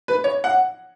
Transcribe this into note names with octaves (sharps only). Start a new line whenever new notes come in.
B4
C#5
F#5